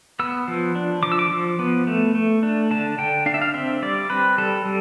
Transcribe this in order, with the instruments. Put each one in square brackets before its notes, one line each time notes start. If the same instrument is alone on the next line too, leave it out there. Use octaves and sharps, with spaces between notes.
[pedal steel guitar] B3 E6
F3
D4
F3 D6
E6
D6
F3
B3
A3
A3
D4
D3 A5
D3 G5
D4 F5
E5
F5
C4 E5
G3 D5
C4 B4
G3 A4
G3